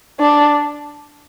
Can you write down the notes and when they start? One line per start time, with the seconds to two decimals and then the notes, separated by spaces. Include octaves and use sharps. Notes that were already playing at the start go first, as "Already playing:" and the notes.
0.20 D4